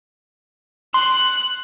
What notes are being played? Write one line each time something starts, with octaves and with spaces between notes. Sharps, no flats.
C6 F#6